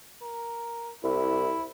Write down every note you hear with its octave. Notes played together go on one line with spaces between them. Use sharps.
A#4
C2 E4